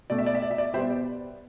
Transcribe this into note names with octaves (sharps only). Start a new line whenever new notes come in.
B2 A3 D5
E5
D5
E5
D5
E5
D5
B2 G3 B3 C5 E5
D5